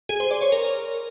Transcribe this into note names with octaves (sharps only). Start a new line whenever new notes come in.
G#4
C5
D5
C#5
A#4